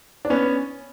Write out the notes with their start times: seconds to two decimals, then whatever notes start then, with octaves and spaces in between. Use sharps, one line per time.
0.25 D4
0.30 B3 C#4